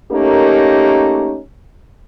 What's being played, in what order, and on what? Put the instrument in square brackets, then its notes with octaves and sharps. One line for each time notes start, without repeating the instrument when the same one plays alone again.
[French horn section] A3 A#3 C#4 D#4 G4 A#4